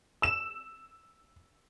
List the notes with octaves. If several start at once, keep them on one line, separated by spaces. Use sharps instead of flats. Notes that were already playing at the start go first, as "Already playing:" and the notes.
E6 E7